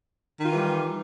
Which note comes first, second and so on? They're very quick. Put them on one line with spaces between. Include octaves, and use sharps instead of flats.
D#3 F4 E3 G3